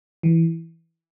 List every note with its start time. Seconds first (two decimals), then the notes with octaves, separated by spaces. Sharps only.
0.23 E3